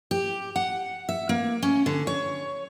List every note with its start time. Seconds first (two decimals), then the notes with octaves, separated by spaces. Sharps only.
0.11 G4
0.56 F#5
1.09 E5
1.29 A#3
1.62 C#4
1.86 D3
2.07 C#5